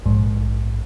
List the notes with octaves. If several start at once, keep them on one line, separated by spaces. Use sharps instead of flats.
A#1 G#2